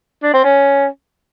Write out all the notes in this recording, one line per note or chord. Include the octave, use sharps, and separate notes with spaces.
D4
C4
C#4